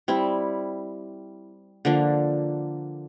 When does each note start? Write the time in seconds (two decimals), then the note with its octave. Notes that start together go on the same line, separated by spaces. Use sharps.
0.08 G3 C4 E4
1.85 D3 F3 A#3 D4